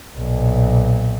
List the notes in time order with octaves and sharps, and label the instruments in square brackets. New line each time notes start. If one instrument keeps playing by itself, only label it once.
[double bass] B1 A#2